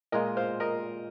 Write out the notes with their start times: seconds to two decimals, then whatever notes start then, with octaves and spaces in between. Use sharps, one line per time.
0.12 A#2 G#3 F4 A#4 D#5
0.37 C5 F5
0.60 A#4 D#5